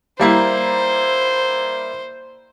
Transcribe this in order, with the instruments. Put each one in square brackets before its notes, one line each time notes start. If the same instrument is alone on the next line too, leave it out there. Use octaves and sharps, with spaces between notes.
[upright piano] G3 A#3 E4 [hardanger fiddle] C5